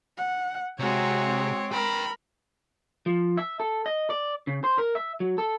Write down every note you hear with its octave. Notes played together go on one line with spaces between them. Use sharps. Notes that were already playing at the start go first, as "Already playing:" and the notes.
F#5
C3 G#3 C4 F#4 G#4 C#5
A#4 B4 G5 B5
F3
E5
A4
D#5
D5
C#3
C5
A#4
E5
F#3
A4